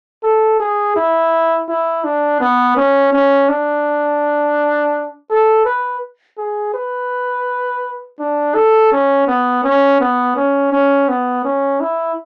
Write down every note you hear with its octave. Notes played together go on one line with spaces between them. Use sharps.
A4
G#4
E4
E4
D4
B3
C#4
C#4
D4
A4
B4
G#4
B4
D4
A4
C#4
B3
C#4
B3
C#4
C#4
B3
C#4
E4